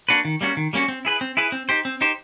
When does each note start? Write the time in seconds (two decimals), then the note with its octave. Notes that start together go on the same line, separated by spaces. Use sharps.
0.09 A#3 D4 F#4 B4
0.25 D#3
0.41 G3 A#3 C#4 F#4
0.57 D#3
0.73 G3 A#3 C#4 F#4
0.88 C4
1.05 E4 G#4 B4
1.21 C4
1.37 E4 G#4 B4
1.52 C4
1.69 D#4 G4 C5
1.85 C4
2.01 D#4 G4 C5